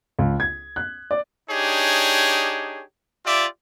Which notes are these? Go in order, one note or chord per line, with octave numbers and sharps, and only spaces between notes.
C#2
G#6
F#6
D5
D4 D#4 G4 G#4 C#5
F4 G4 D5 E5 D6